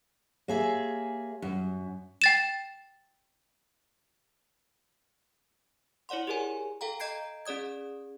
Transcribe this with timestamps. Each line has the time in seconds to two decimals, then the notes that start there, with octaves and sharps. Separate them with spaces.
0.48 A#3 G4 G#4 C#5 E5 F5
1.42 F#2
2.22 G5 A6 E7
6.09 E4 C#5 D5 F#5 C6
6.27 G4 G#4 A#4 C#5 G#5
6.81 A4 F5 G5 A#5
7.00 D#5 A#5 G6 G#6 C7 D7
7.45 C#4 G#4 D5 D#6 G#6